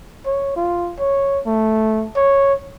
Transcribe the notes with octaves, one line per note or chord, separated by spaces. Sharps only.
C#5
F4
C#5
A3
C#5